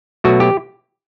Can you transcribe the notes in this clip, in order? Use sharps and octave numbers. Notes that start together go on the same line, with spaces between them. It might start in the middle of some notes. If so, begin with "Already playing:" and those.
B2 F#3 A3 F#4
G4